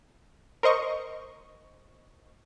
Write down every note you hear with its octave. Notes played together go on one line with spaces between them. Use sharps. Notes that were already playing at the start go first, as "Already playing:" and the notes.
A#4 C5 D#5 C#6